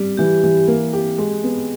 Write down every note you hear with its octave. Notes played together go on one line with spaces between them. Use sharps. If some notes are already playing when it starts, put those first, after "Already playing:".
Already playing: G3
E3 G4
E3
A#3
G4
G#3
B3